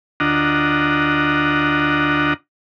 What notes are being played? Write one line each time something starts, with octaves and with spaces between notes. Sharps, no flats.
D2 D4 F4 D#5 F#5 A#5